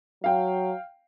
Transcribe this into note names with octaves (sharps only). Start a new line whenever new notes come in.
F#3 F5 G5